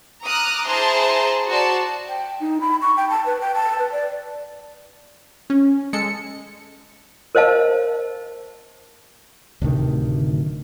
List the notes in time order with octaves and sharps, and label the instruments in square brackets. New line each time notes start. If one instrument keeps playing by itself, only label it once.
[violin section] A#5 D6 D#6 F6 F#6
E4 G#4 C5 A5 A#5 C6
F#4 C5 D5 A5
[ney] G5
D#4
B5
C#6
G5
A5
B4
G5
A5
B4
D5
[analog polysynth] C#4
G#3 A4 C#7
[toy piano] A#4 C5 D#5 F5 A5
[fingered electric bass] D1 D2 C3 D#3